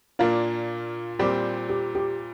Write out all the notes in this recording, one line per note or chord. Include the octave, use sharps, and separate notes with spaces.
A#2 A#3 D4 F4
A#2 G3 C4 G4
G4
G4